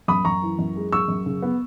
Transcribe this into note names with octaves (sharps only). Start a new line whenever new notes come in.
F#2 B5 D#6
F#2 A#5 C#6
E3
F#2
G#3
F#2 C#6 E6
F#2
C#3
B3